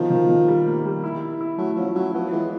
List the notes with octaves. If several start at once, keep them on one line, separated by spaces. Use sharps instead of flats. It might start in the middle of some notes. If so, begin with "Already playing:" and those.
Already playing: B2 D#3 F3
D#3
D#3
G3
A#3
G3
E4
E4
E4
F#3 A3
F3 C#4
F#3 E4
F3 B3
E3 G#3